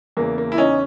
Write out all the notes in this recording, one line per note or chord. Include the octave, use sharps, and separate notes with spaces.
E2 C#3 E3 A#3
A#3
E4
C#4 D#4